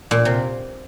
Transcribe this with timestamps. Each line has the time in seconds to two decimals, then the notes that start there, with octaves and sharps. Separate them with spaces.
0.11 A#2
0.25 C3